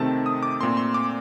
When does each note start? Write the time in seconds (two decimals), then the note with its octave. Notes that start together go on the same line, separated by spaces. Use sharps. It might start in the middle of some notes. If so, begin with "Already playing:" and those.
Already playing: C3 D#3 A3 C4 A5
0.26 D#6
0.43 D6
0.61 A#2 A3 C4 C6
0.77 C6
0.94 D6